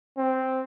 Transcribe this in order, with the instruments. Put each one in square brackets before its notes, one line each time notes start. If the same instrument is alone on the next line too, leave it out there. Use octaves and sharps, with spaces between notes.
[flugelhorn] C4